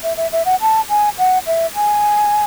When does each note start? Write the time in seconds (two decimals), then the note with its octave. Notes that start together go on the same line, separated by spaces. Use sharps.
0.03 E5
0.17 E5
0.32 E5
0.46 F#5
0.61 A5
0.89 G#5
1.18 F#5
1.47 E5
1.75 G#5